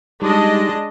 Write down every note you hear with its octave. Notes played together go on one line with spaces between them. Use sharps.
G3 G#3 D4 D#4 G4 D#5